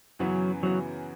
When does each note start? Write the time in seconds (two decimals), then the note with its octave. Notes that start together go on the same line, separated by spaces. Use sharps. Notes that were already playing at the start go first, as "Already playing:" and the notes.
0.19 F#2 C#3 E3 F#3 B3 F#4
0.63 C#3 E3 F#3 B3 F#4